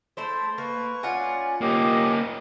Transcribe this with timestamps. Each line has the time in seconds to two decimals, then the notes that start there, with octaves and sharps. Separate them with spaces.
0.17 A3 E4 C5
0.58 A#3 B4 C#6
1.03 C#4 F4 D5 F#5 G#5
1.61 A#3 C#4 G4 D#5